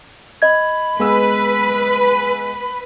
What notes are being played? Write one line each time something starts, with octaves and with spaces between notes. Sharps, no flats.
D#5 B5 G#6
G#3 B3 B4 E6